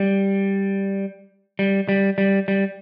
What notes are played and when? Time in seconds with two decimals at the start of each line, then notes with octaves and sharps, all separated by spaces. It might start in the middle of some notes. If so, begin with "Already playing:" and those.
Already playing: G3
1.59 G3
1.89 G3
2.18 G3
2.48 G3